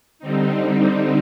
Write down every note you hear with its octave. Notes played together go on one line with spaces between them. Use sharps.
D3 G3 C4 D#4